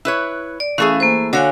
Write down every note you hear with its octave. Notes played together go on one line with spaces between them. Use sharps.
E4 B4 C#5
D5
E3 A3 C#4 G#4 F5
A#3 C5
D3 F#4 C#5 F5 G#5